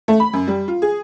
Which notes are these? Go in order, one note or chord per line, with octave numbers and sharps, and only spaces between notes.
A3
B5
F#2
G3
F4
G#4